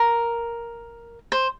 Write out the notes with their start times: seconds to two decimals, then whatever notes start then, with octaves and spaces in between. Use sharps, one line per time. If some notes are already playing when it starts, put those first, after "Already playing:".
Already playing: A#4
1.32 C5